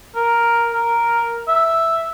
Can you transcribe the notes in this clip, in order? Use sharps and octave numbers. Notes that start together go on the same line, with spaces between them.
A#4
A#4
E5